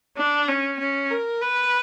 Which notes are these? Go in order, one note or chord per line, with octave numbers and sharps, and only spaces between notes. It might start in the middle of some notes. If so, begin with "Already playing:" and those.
D4
C#4
C#4
A#4
B4